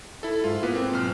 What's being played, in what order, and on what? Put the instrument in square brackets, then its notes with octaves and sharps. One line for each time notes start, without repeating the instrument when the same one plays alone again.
[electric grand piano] E4 A4
[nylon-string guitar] G#2 [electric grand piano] F4
[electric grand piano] A#3 B3 B4
C4
B1 F6